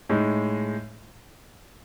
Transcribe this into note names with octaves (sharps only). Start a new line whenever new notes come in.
A2 G#3 D#4